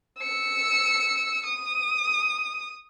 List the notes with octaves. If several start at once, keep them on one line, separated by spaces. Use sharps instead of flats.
E6 C#7
D#6